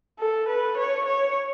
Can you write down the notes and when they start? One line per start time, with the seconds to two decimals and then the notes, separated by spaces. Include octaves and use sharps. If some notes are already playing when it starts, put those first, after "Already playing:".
0.19 A4
0.48 B4
0.77 C#5
1.05 C#5